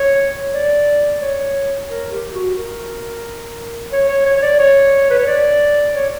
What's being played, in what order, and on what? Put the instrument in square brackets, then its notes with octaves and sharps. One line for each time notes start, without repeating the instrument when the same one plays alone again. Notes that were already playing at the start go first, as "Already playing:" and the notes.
Already playing: [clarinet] C#5
D5
C#5
A#4
G4
F#4
A#4
C#5
C#5
C#5
C#5
D5
C#5
B4
C#5
D5
C#5